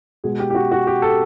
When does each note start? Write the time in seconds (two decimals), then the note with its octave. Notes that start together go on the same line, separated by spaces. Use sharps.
0.24 B2 G#3 G#4
0.40 G4
0.50 G4
0.55 F#4
0.71 F#4
0.87 G4
1.02 A4